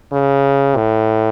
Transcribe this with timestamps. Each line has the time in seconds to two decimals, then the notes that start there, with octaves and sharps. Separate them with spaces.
0.13 C#3
0.76 A2